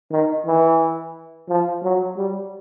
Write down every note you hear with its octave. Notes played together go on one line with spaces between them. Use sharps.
D#3
E3
F3
F#3
G3